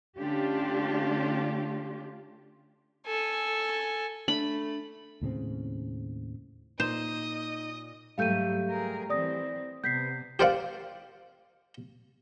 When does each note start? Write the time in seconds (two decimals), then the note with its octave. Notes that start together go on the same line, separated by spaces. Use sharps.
0.18 D3 A3 C#4 D4 F4 G4
3.07 A4 G#5
4.28 A3 D4 B5
5.21 D#2 A2 C#3 C4
6.80 A#2 D#4 C5 D#5
8.18 G#2 F#3 G3 A3 G4 F5 G6 D#7
8.70 G#4 A#4
9.10 E3 C4 D5 D#6 A#6
9.84 C3 B3 G6 B6 C7
10.39 G4 A#4 C5 D5 F5 F#5